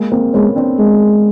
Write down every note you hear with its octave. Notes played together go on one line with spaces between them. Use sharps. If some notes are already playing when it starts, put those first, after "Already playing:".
Already playing: G#3 A#3
A#3 C4
G#3 B3 C#4
C4 D4
G#3